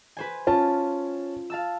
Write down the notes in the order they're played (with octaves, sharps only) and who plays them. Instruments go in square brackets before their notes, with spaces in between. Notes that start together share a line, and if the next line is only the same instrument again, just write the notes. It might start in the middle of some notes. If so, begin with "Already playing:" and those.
[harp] B4 C5 G#5
[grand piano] C#4 A5 [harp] F4
[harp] F5 A5 E6